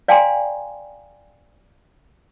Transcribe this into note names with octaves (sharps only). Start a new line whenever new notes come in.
D5 F5 G5 G#5 A#5 C6